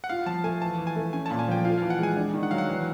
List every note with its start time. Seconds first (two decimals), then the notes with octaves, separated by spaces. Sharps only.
0.04 F#5
0.09 F4 F5
0.26 F3 A5
0.44 A3 G#5
0.61 E3 A5
0.78 E3
0.87 G#5
0.96 A3
1.13 C#4 G#5
1.26 A#2 A5
1.39 G#5
1.48 F3 G5
1.64 F4 F5
1.78 E3 F5
1.90 F#5
1.99 G#3 G#5
2.16 D4
2.33 D#3
2.43 F#5
2.51 F#3 F5
2.58 F#5
2.69 E3